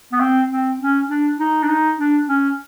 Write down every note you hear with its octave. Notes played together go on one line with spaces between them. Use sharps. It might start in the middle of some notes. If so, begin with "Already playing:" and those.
B3
C4
C4
C#4
D4
D#4
D4
D#4
D4
C#4